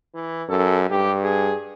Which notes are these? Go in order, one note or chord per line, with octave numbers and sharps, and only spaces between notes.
E3
F#2 A4
G2 G4
G#4